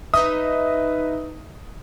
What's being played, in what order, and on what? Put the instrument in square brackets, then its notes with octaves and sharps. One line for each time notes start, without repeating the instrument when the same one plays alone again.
[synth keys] D#4 D#5 E5 [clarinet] B4 [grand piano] D#6